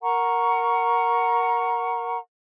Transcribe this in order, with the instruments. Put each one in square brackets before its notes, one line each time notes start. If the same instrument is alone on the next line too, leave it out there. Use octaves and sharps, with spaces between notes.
[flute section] A#4 F#5 A#5 C#6